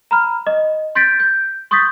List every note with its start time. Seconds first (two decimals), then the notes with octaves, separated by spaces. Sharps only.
0.11 A#5 B5 F6
0.47 D#5
0.95 C6 G6 A6 B6 D7
1.20 G6
1.71 C6 C#6 D#6 G6 A6 B6